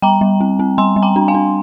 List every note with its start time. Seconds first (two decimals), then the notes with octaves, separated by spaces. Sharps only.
0.02 G3 G5 A#5
0.21 G3
0.41 C4
0.59 C4
0.78 G3 G#5 C6
0.96 G3
1.02 G5 A#5
1.16 D4
1.28 F5 G#5
1.34 D4